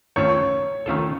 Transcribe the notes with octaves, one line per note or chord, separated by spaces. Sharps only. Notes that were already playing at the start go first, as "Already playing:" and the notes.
D#3 A3 C#4 F4 A4 C#5
D#3 A3 C#4 F4 A4